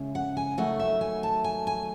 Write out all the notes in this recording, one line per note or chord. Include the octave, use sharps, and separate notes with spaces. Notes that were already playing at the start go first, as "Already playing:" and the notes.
Already playing: C#3 G#3 C#4 E4
F#5
G#5
D#3 F#3 A3 F#5
E5
G#5
A5
G#5
G#5